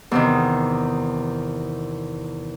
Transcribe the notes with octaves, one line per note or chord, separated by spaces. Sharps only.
E2 C3 D#3